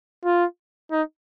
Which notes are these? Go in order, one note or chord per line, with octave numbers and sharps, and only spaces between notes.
F4
D#4